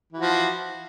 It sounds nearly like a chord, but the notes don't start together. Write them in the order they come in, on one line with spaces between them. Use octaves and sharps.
E3 F#4 F3